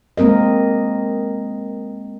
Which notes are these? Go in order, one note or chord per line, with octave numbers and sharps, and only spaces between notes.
G#3 A#3 C4 A#4 D#5